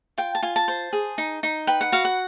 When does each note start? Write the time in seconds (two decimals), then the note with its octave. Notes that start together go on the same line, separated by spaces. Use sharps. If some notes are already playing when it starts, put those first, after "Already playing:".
0.18 F4 G5
0.35 A5
0.43 F4 G#5
0.56 A5
0.68 C5
0.93 G#4
1.18 D#4
1.43 D#4
1.67 B4 G5
1.81 F#5
1.92 F#4 F5
2.05 F#5